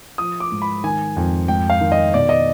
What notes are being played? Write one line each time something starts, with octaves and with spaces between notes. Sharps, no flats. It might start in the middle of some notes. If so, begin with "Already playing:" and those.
F3 D#6
D6
G#2
B5
D#3 G#5
F2
G#2 G5
F5
D#3
D#5
B2 D5
D#5